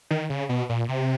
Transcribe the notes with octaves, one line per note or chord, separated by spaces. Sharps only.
D#3
C#3
B2
A#2
C3